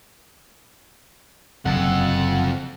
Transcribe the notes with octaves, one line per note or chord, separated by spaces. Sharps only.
F#1 F2 C3 A4 F#5